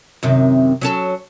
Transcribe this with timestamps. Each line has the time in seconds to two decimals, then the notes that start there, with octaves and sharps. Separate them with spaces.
0.23 F#2 C3 D#3
0.81 F#3 C#4 A4